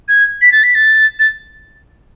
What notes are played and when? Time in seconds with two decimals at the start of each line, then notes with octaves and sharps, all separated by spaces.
0.09 G#6
0.42 B6
0.52 A6
0.63 B6
0.75 A6
1.19 A6